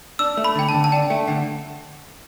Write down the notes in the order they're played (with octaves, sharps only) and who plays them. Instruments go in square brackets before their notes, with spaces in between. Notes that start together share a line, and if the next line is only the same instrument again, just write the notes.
[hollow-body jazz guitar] D4 [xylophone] E6
[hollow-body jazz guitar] A3
[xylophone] B5
[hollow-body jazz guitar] D3 [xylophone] G5
[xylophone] A5
[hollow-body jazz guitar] D3
[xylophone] A5
[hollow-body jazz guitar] D4 [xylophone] G5
[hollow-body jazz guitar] A3 [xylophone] G5
[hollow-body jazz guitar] D3 [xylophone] F#5